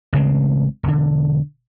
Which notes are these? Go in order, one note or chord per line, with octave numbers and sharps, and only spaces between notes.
A1 C#3 G#3 C4
E1 D3